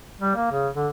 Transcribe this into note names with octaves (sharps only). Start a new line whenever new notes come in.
G3
A#3
C#3
D3